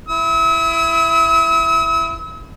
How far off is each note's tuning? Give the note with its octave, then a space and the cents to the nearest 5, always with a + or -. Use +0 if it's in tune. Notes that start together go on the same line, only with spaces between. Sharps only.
E4 +15 E6 -45